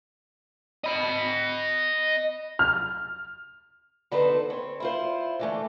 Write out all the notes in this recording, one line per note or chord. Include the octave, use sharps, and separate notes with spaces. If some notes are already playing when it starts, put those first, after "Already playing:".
D#5 B5
F6
D3 B3 D#4 A4 B4 C5
C4 C#5
E4 F4 C5
D3 E3 A3